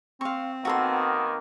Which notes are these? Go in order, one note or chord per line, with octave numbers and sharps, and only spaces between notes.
C4 F5 C#6
D#3 A#3 B3 F#4 A4 C6